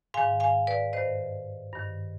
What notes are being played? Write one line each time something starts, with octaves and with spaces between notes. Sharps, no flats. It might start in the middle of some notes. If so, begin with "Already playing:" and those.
G#2 D#3 F5 G#5
F5 G#5
B4 D5
G2 D#3 C5 D#5
G2 D#3